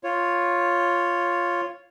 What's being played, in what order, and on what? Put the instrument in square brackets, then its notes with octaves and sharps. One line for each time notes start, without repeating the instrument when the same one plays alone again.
[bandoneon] F4 C#5